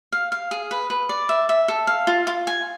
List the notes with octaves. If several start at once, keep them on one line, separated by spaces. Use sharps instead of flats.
F5
F5
G#4
B4
B4
D5
E5
E5
A4
F5
F4
F4
G#5